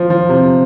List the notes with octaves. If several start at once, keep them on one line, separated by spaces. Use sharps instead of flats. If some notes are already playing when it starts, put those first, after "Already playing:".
Already playing: F3
F3
C3